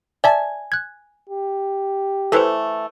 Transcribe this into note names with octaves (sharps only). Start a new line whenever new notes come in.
D5 E5 G#5 A5
F#6 G#6
G4
E3 A3 E4 A4 B4 C5